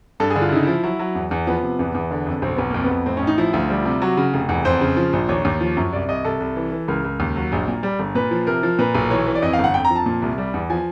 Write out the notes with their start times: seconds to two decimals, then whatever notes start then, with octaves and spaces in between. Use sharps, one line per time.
0.20 G2 A4
0.30 G#4
0.36 D3
0.41 F4
0.49 E4
0.52 C#3 D#4
0.63 F3 E4
0.83 F#3 E4
0.99 F#3
1.15 E2
1.31 E2
1.47 F3 B3
1.63 C3
1.79 E2 B3
1.95 E2
2.11 D3
2.27 F2
2.42 B1 C4
2.56 B1 B3
2.70 F2 A#3
2.84 B3
2.90 F2
3.06 A2 C4
3.17 C#4
3.22 A1
3.27 D#4
3.38 F3 E4
3.54 D2 F4
3.70 G3
3.85 C3
4.02 F#3 F#4
4.17 C#3
4.34 F1
4.49 E2
4.65 F2 C5
4.81 C#3
4.97 F3
5.13 A#1
5.29 D#2 C#5
5.45 D#2
5.60 F3
5.77 F#2
5.93 C2 D5
6.09 C2 D#5
6.25 C2 A4
6.40 C2
6.56 E3
6.72 E3
6.88 C#2 A#4
7.04 C#2
7.20 D#2
7.36 F#3
7.52 A#1
7.68 A#2
7.83 G3
7.99 G1
8.15 A#2 B4
8.31 F3
8.47 C3 A#4
8.63 F3
8.79 A#2 B4
8.95 B1
9.10 E3 C#5
9.26 E3
9.35 D5
9.42 F2 D#5
9.53 F5
9.59 G1
9.64 F#5
9.74 F2 G5
9.85 A#5
9.90 F3
9.96 A5
10.06 A#2
10.22 C2
10.38 G3
10.54 E2
10.70 F3 G#5